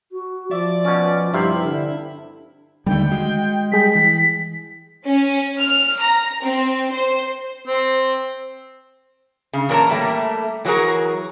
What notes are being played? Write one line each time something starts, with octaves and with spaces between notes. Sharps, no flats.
F#4
F3 D5 E5
B2 C#4
G2 C3 E4 F5
D3 D4
D#2 D3 D#3 G3 A3 G5
G#3 F#4
G3 G#4 G5 B6
E3
C#4
F6
A#5
C4
C5
C4
C#3
A#2 E3 A#4 C#5 A5 A#5
G3 A3 A#3
E3 F#3 F#4 G#4 A#4